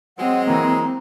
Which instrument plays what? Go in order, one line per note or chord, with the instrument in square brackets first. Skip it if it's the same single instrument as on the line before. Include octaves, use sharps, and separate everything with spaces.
[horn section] F#3 G#3 [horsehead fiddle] C4 [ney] F#5
[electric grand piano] E3 A#3 [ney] A#5